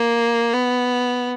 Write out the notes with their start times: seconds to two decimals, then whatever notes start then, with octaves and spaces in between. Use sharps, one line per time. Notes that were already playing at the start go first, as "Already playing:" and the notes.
Already playing: A#3
0.53 B3